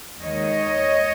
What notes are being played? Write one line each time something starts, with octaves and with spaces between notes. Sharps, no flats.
D#2 D#3 G#3 C#5 D#5